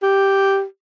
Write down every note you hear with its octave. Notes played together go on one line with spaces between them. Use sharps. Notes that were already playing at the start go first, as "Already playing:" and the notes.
G4